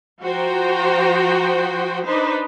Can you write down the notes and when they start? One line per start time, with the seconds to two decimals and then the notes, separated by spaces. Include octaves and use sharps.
0.21 F3 F#4 C5 G5 A#5
2.05 D4 D#4 B4 C5